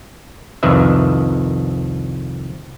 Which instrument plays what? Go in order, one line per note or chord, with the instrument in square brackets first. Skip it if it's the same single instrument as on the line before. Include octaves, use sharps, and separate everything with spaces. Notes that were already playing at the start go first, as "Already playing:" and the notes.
[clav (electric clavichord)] C2 F2 D#3 B4 E5